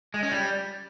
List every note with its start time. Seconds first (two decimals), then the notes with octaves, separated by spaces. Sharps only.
0.14 G#3
0.23 C#4
0.31 G3